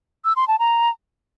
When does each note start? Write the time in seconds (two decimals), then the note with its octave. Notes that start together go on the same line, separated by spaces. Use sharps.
0.25 E6
0.36 C6
0.48 A5
0.59 A#5